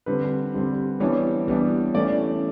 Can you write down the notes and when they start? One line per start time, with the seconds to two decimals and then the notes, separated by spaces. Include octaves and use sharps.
0.06 D3 G3 C4 B4
0.54 D3 G3 C4
1.00 E3 G3 B3 D4 C#5
1.48 E3 G3 B3 D4
1.94 E3 A3 C#4 D5